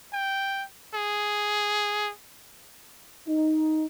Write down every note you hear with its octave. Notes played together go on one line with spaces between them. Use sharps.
G5
G#4
D#4